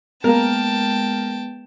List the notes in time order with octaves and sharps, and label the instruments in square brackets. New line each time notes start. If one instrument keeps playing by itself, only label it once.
[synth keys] G#3 B3 [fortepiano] A#3 A#4 [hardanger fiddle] G5 A5